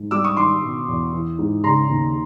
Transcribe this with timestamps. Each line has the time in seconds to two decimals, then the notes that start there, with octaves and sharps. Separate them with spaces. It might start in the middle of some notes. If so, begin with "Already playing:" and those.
Already playing: G#2
0.11 G3 D6 E6
0.24 C#6 D#6
0.37 D#3 C6 D6
0.62 B2
0.88 E2
1.13 E3
1.39 G#2
1.64 C#3 A#5 C6
1.89 D#2